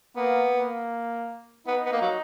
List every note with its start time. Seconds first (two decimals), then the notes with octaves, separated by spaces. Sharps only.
0.16 A#3 B3
0.55 A#3
1.67 B3 D#4
1.86 B3
1.92 A#3
2.01 F#3